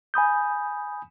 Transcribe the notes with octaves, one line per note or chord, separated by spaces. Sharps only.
G#5 B5 D#6 G6